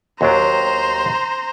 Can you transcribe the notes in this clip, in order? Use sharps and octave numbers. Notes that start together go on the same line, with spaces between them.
D#2 F#3 D4 C5 A#5